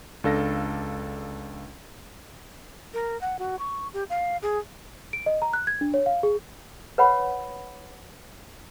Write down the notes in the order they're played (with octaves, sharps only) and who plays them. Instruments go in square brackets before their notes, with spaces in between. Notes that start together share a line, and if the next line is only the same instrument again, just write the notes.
[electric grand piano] C#2 D4 A4 F5 A#6
[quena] A#4
F#5
F#4
C#6
G4
F5
G#4
[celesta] D7
D#5
A#5
F#6
G#6
D4
C#5
F5
G#4
[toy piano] B4 C#5 F#5 B5